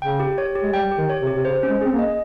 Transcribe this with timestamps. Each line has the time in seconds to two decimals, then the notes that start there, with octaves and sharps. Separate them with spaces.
0.02 C#3 G5
0.20 G4
0.38 C#5
0.55 G4
0.63 G#3
0.73 G3 G5
0.92 G4
0.98 D#3
1.09 C#5
1.22 C3
1.27 G4
1.36 C3
1.45 C#3 C5
1.63 C#4
1.69 G#3
1.81 C4 G#4
1.92 A#3
1.99 D#5